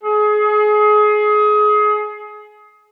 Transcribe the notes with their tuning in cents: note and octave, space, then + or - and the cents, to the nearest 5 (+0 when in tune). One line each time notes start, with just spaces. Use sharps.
G#4 +25